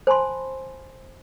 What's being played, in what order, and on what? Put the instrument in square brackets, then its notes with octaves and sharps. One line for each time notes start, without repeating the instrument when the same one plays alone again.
[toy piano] C5 G#5 A5 B5 C6